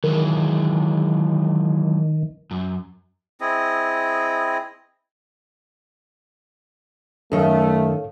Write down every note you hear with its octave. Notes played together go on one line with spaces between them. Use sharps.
D#3 E3 F#3 G#3
F#2
C4 E4 G#4 D#5
F#2 D#3 A3 A4 C#5 F5